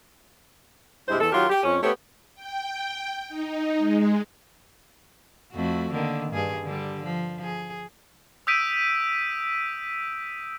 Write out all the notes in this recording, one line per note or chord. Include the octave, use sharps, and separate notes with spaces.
G2 C3 G#3 E4 C5
E2 A4
D#3 F#3 F4 G4 A#4
G4
F2 C#4
A3 B3 G4 C5 C#5
G5
D#4
G#3
F2 A3 F#4
D3 D#3 A#3
G2 G#4
D3 G3
F3
G#4
D#6 E6 G6 B6 D7 D#7